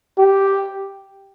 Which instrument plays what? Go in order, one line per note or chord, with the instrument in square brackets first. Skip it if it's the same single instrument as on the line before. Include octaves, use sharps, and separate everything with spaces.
[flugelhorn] G4